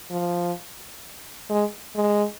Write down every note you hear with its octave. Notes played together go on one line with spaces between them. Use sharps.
F3
G#3
G#3